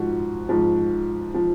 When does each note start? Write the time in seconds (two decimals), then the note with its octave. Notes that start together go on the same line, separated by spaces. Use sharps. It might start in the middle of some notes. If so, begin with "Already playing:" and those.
Already playing: G#2 F3 F#4
0.49 G#2 F3
1.34 F3